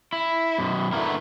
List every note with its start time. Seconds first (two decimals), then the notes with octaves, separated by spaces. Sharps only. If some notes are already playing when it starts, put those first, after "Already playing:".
0.12 E4
0.58 F#2 B2
0.93 D3 A3 B3 E4 A#4